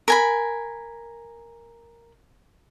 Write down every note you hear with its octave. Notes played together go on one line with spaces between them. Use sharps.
A#4 G#5 B5